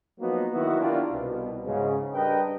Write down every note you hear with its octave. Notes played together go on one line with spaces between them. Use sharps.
F3 F#3 A#3 B3 D#4 F#4
D#3 F#3 B3 E4 F#4
D4 E4 F4 G4 A#4 D5
C2 B2
G#2 C#3
G3 D4 A#4 B4 D#5 G5